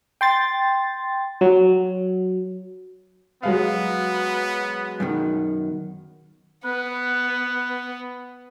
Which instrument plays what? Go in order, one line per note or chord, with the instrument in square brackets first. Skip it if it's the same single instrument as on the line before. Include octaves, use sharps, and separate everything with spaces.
[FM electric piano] G5 C6 A6
F#3
[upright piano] F#3 G#3 F5 [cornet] B3
[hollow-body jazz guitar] F#2 B2 D#3
[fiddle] B3 [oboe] B4